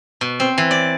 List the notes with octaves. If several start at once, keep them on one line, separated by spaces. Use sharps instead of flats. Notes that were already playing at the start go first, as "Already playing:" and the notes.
B2
C4
E3
D5